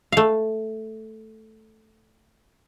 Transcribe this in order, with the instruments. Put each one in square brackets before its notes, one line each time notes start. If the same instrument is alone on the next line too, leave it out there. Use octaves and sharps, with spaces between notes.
[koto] A3 F5